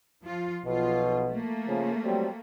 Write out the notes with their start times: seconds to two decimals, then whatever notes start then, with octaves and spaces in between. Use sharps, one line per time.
0.22 F3 F4
0.64 B1 B2 F3 F4
1.30 A3 A#3
1.67 C#3 F3
2.04 F#3 G3 C4